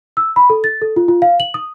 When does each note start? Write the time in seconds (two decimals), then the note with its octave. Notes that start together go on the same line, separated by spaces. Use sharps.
0.17 E6
0.36 B5
0.50 A4
0.64 A6
0.82 A4
0.96 F4
1.08 F4
1.22 F5
1.40 F#7
1.54 D#6